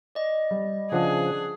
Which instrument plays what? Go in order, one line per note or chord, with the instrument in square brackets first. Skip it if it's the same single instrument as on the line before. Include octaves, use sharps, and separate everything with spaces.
[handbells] D5 D#5
[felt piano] G3
[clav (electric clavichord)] C#3 F3 [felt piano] D4 F#5 [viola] G#4